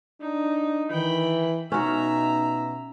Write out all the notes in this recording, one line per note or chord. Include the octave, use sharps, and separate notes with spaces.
D4 D#4
D#3 E3 G5 B5
B2 C#4 D#4 F#4 E5 A#5